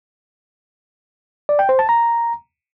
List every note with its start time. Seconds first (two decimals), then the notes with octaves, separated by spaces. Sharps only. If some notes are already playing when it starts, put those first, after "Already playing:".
1.49 D5
1.59 G5
1.69 C5
1.79 A5
1.89 A#5